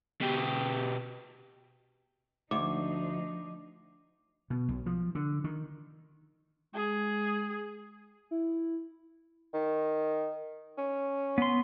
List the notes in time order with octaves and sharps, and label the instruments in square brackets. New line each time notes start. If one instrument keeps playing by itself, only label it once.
[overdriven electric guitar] B2 G4
[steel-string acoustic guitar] D2 [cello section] F3 D4 D#4 [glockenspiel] D6
[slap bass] B2
B1
F3
D3
D#3
[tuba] G#3 [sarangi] G#4
[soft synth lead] E4
[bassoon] D#3
C#4
[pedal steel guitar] B3 C6